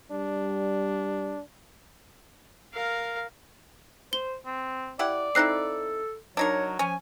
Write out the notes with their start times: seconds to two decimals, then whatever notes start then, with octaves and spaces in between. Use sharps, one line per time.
0.11 G3 D4
2.74 A#4 F5
4.13 C5 G7
4.46 C4
4.99 E4 G4 D5 F#5
5.35 C4 D#4 E4 A4 F#6 C7
6.37 F#3 D4 D#4 A#4 C#5
6.79 F3 C#4 G#5